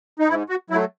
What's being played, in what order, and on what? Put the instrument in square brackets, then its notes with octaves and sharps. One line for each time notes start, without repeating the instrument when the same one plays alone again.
[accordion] D#4
G#2 E4
F#4
F#3 E4
A3